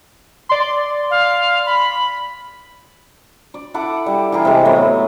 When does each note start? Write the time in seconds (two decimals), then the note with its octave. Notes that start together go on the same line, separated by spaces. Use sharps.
0.49 D5 C6
1.10 F5
1.66 B5
3.54 D5
3.74 E4 A4 F#5 D6
4.06 G3
4.32 E3 G4 G#4 A#4
4.45 C3 G#3
4.65 A2 F#3 B3